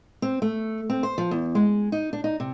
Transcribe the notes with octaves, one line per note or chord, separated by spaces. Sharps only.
C4
A3
C4
C5
F3
E2
G#3
D#4
D4
D#4
C3